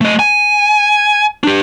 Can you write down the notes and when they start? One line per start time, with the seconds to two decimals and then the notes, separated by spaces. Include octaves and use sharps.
0.01 A3 D#5
0.19 G#5
1.44 D4 G4